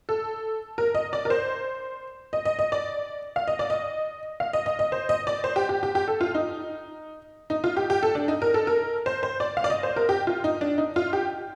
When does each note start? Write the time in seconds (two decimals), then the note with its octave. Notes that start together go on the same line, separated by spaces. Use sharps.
0.09 A4
0.78 A#4
0.95 D#5
1.13 D5
1.25 A#4
1.30 C5
2.33 D#5
2.45 D#5
2.59 D#5
2.72 D5
3.36 F5
3.47 D#5
3.59 D5
3.70 D#5
4.40 F5
4.53 D#5
4.66 D#5
4.79 D#5
4.92 C5
5.09 D#5
5.27 D5
5.44 C5
5.56 G4
5.69 G4
5.83 G4
5.95 G4
6.08 A4
6.21 F4
6.35 D#4
7.50 D#4
7.64 F4
7.76 G4
7.90 G4
8.03 A4
8.15 D4
8.28 D#4
8.42 A#4
8.54 A4
8.67 A#4
9.06 C5
9.23 C5
9.40 D5
9.57 F5
9.64 D5
9.70 D#5
9.83 C5
9.96 A#4
10.09 G4
10.27 F4
10.44 D#4
10.61 D4
10.78 D#4
10.96 F4
11.13 G4